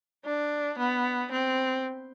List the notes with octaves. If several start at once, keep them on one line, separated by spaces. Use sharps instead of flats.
D4
B3
C4